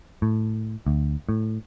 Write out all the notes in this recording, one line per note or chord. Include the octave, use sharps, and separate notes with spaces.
A2
D2
A2